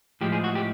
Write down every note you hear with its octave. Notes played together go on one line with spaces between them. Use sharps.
A2 F3 G#3 G4
G#4
F#4
G4